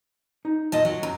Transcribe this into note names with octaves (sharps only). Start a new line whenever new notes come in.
D#4
A#2 D#5 A5
F#3
F#2 A#5